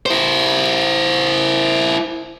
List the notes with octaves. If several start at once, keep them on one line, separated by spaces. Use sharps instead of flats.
E4 C5